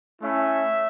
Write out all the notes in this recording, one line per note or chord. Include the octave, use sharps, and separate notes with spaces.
A3 C#4 E4 E5